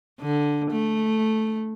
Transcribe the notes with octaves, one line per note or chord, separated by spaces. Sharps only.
D3
A3